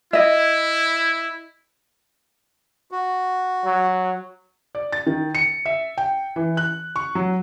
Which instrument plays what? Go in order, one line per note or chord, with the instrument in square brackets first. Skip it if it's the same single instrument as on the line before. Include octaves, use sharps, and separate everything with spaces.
[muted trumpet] E4 [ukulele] D#5 E5
[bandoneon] F#4
[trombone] F#3
[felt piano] D5
A6
D#3
C#7
E5
G5
E3
F#6
C#6
F#3